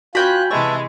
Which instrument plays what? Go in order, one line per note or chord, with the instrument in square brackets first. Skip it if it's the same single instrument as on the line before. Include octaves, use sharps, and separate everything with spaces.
[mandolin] C#4 G5 B5 [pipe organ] F4 F#6 [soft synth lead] F#4
[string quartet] C3 E3 G#3 [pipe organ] B4 E5 A5 [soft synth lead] C#6